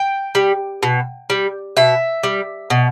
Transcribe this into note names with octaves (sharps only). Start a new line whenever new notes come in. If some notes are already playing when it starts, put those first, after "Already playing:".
Already playing: G5
G3
B2
G3
B2 E5
G3
B2